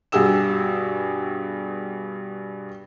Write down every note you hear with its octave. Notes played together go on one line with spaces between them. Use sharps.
G2 B2 G4 G#4 E6 E7